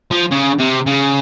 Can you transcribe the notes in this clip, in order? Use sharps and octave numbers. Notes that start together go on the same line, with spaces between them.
F3
C#3
C3
C#3